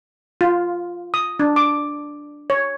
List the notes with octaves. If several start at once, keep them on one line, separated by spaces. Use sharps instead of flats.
F4
D#6
D4
D6
C#5